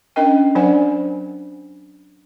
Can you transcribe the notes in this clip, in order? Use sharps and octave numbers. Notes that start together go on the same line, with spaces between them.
C#4 D4 A#4 D#5 G5
F#3 D4 A#4 C5 F#5 G#5